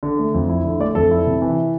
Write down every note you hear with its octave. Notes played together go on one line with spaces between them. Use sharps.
D3
A3
F2
E4
D3
A3 D5
F2 A4
E4
C3
E3